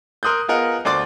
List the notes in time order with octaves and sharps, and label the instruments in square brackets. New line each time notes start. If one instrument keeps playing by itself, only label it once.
[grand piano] A#4 C6 D#6 F#6 G6
B3 F4 G#4 A#4 D#5 F#5
D2 C5 D5 C6 D6 A6